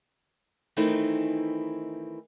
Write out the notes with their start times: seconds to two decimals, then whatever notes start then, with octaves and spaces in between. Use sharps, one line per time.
0.77 D#3 E3 A3 C4 D#4 E4